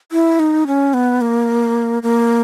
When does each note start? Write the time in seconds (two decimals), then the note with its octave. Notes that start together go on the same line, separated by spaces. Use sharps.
0.12 E4
0.39 D#4
0.67 C#4
0.94 B3
1.21 A#3
2.03 A#3